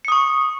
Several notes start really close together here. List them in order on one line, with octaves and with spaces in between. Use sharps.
C#7 D#6 C#6